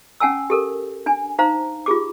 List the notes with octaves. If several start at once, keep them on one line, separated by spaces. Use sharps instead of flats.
C#4 F#5 G#5 A5 E6
G4 A4 A#4
D4 G#5
D#4 C5 F5 A#5
F4 G4 G#4 D6